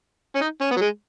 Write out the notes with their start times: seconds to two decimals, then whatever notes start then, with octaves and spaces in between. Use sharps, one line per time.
0.35 C#4
0.41 D#4
0.61 C#4
0.71 B3
0.76 F#3
0.81 G#3